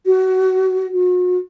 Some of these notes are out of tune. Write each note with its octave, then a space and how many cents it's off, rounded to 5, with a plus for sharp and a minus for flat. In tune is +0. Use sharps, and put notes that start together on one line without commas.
F#4 +25
F#4 -40